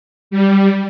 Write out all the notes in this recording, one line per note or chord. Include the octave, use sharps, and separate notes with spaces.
G3